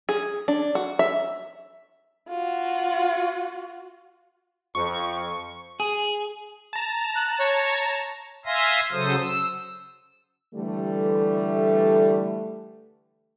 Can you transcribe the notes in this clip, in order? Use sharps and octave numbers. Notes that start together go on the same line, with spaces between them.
G#4
D4
F#4
E5
F4 F#4
F2 C#6
G#4
A5 A#5
F#6
C#5
E5 F5 G#5 C6 A#6
C#3 F#3 A4 C5 D#6
E6
D3 E3 G3 A3